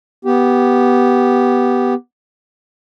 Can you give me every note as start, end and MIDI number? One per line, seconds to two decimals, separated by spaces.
0.25 1.94 59
0.25 1.94 67